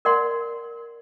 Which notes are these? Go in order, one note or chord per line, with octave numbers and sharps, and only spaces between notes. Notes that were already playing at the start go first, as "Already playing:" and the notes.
A#4 D5 F#5 C6